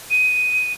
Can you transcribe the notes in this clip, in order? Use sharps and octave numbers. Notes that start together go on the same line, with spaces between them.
D#7